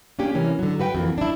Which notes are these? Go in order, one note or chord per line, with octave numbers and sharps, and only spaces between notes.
A#3 C#4 D4 G4
C3 E3 A#3 C#4
D3 F#3
F#4 B4 F#5 G5
F2 E3 A#3
D4 E4